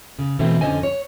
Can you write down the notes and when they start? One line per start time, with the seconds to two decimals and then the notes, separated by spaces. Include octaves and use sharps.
0.19 C#3
0.39 B2 E3 A3 C4 E4
0.61 F2 D3 C#4 C5 D#5 G#5
0.83 C#5